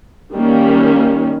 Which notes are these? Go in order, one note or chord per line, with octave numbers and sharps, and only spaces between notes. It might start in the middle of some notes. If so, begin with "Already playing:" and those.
D#3 G3 A#3 C#4